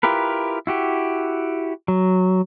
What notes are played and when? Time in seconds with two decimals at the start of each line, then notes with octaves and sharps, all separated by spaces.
0.03 E4 F4 G4 A#4 B4
0.67 E4 F#4 G4
1.88 F#3